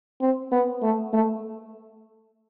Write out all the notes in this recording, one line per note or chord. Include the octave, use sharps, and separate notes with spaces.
C4
B3
A3
A3